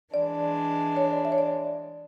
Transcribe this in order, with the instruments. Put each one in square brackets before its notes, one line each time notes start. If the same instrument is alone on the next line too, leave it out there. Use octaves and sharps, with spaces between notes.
[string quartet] E3 G#3 D4 [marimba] D5
[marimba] C#5
D5
E5
C#5
D5